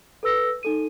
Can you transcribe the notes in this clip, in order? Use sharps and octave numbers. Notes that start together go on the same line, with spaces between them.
A4 B4 E6 A#6
D#4 A4 D#7